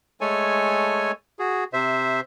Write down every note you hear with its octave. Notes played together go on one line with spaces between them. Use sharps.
G#3 A3 A4 C#5 G#5
F#4 G#4
C3 C5 E5